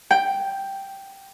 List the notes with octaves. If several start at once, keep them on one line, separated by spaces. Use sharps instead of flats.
G5